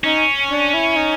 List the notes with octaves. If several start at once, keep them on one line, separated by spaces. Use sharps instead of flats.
C#4 D#4
D4
E4
D#4